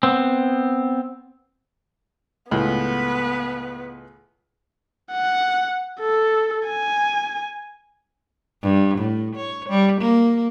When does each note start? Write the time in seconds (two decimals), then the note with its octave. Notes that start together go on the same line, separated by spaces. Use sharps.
0.03 B3 C4
2.51 C#2 A2 B3 B4
5.12 F#5
6.00 A4
6.68 G#5
8.63 G2
8.97 A2
9.36 C#5
9.69 G3
10.01 A#3